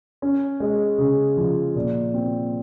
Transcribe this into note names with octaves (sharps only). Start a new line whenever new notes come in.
C#4
G#3
C#3
F3
A#2
C4